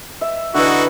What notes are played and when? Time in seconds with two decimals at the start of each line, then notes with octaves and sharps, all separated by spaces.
0.21 E5
0.54 D3 E3 D#4 E4 F#4